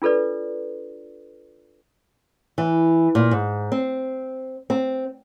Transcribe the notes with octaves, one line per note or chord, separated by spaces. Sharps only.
D4 F4 A4 B4 D5
E3
A#2
G#2
C4
C4